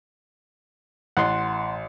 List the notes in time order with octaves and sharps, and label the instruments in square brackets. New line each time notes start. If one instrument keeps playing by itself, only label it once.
[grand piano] A1 [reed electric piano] F#5 C6